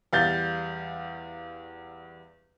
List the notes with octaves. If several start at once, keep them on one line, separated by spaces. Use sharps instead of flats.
E2 G3 F5 G6 A6